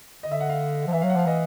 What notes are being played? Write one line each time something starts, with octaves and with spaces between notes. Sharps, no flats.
D3 D#5
E5
F#5
F5
F3
E3 E5
F#3 F5
F#5
F3 F5
E3 D#5